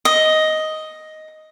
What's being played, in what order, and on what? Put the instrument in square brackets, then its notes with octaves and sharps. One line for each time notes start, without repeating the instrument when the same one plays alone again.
[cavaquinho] D#5